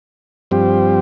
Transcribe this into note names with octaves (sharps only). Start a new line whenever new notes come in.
G2 F3 C4 G4